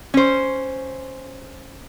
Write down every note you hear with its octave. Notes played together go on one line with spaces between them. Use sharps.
C#4 C5